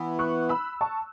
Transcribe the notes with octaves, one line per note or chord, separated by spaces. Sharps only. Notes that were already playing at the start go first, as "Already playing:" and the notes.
Already playing: E3 B3 E4
C#6 F#6
B5 E6
A5 C#6